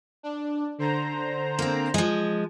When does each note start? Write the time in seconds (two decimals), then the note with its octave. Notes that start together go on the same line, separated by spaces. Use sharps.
0.23 D4
0.78 D3 C5 A#5
1.59 A#3 C4
1.94 F3 G#3